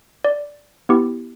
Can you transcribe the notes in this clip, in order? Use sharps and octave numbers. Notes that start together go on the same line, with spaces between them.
D5
B3 E4 G4